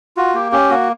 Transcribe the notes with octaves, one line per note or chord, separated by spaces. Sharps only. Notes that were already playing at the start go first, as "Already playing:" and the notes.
F4 F#4
A#3 G4
C#4 G4
A#3 F#4